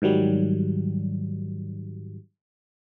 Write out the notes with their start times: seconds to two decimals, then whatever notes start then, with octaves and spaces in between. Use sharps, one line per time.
0.02 G#2 D#3 F#3 G3